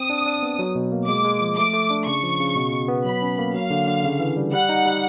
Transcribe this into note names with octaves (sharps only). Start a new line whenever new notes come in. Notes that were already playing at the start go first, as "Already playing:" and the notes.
Already playing: C4 D#6
D4
D4
B3
F#3
B2
A#3
G#3 D6
G#3
F3
A3 D6
A3
D4
C#3 C#6
F3
C#3
B2
B2
B3
F#3 B5
C#4
A#3
F#3 F5
D3
D3
C#3
E3
G3
G3 F#5
D#4
G3